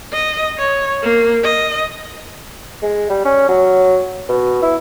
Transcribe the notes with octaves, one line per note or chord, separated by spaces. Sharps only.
D#5
C#5
A#3
D#5
G#3
G3
C#4
F#3
B2
E4